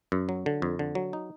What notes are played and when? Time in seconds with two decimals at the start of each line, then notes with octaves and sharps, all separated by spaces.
0.12 F#2
0.29 F#3
0.46 D3
0.62 F2
0.79 D3
0.95 F#3
1.13 D#4